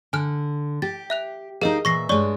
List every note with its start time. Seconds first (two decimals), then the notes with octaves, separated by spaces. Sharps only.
0.13 D3 G#5 F6 F#6
0.82 G4 A6
1.10 E5 F#6 F7
1.61 D#4 G4 G#4 A#4 D#5 F5
1.85 A#2 E3 E5 C#6 A#6 C7
2.09 G2 G#3 D4 C#5 D5 C#6